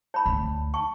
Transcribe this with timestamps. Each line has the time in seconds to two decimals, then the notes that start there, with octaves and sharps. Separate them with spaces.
0.14 C#5 A5 B5
0.26 D2
0.74 A5 C#6